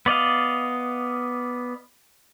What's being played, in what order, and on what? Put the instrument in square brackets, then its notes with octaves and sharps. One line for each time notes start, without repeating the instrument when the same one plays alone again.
[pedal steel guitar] B3 D5 D#5 F5